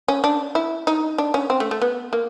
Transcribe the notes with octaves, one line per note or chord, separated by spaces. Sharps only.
C#4
D4
E4
D#4
D4
C#4
C4
A3
A3
B3
A#3